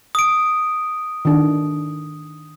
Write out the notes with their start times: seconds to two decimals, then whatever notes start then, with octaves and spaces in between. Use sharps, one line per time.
0.15 D#6 D7
1.25 D#3 D4